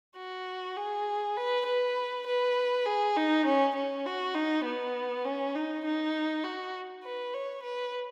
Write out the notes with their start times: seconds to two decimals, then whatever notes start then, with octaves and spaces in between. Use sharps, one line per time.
0.16 F#4
0.76 G#4
1.37 B4
1.66 B4
2.27 B4
2.86 G#4
3.16 D#4
3.45 C#4
3.75 C#4
4.06 F#4
4.34 D#4
4.65 B3
5.25 C#4
5.55 D#4
5.85 D#4
6.44 F#4
7.03 B4
7.34 C#5
7.63 B4